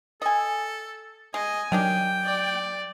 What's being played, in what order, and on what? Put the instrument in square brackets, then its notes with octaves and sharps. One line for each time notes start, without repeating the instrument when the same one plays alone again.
[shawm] A4 [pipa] D#5 G#5
[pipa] G#3 [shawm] D#5 [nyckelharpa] G#5
[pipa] D#3 D4 G4 [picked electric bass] F#3 [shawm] G5
[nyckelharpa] D5